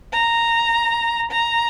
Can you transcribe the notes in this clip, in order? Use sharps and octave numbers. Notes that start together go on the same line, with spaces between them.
A#5
A#5